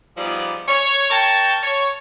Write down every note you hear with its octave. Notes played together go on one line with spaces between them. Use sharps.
F3 G3 B3 D#4 G#4 D5
C#5
A#4 C#5 G5 A5
C#5